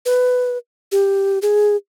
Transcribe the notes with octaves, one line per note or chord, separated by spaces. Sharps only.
B4
G4
G#4